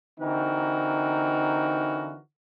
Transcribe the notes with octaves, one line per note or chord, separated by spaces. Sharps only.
D3 E3 C4 D#4 F#4 A#4